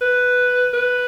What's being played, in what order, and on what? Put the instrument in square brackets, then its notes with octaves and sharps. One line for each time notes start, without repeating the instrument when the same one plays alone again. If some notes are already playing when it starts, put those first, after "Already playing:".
[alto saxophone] B4
B4